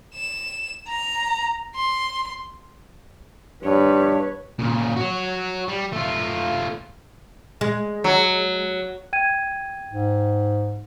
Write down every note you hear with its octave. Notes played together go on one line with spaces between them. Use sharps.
E7
A#5
C6
G2 B4 C#5
A#2 C#3
F#4 C#5
G3
A3 F4
G#3
F#3
G5 G#6 D#7
G#2